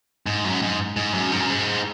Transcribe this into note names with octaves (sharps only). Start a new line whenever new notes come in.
G#2
F#2
G#2
G#2
F#2
G#2
F#2
G#2